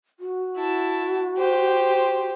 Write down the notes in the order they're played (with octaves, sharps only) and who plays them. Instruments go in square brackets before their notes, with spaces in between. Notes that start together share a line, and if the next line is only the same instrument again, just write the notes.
[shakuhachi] F#4
[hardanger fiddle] E4 A5
G4 C5